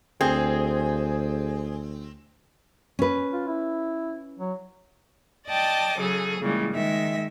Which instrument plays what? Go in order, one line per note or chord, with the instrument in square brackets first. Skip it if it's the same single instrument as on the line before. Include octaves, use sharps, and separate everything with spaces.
[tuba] D2 [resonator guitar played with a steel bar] C4 [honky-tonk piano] G#4
[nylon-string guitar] C#4 B4
[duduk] F4
E4
F#3
[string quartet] D5 D#5 G5 A5 D6
C#3 F#3 G#4 A4
A#2 C#3 E3 G3 G#3
D#3 G#3 E5